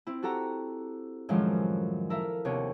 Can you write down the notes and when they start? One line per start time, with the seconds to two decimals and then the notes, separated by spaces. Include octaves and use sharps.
0.07 C4 E4
0.22 F#4 G4 A4 F#5 A#5
1.29 F#2 A2 D#3 F3 F#3 G#3
2.10 E4 A4 A#4 E5 F5
2.45 D#2 C3 B3 D4 C#5